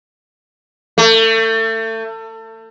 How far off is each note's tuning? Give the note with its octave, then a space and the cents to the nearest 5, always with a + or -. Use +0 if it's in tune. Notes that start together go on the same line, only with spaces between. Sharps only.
A3 +30